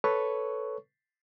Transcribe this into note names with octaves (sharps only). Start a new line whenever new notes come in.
A4 B4 C#5 C#6